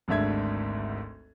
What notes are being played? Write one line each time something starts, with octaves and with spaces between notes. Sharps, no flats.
G#1 D2 G#2 D4 E5 G#6